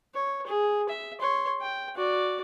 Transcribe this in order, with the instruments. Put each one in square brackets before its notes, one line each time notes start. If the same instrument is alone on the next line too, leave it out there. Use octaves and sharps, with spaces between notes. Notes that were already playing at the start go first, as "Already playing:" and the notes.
[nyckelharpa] C#5
G#4
E5
C#5 C6
G5
F#4 D5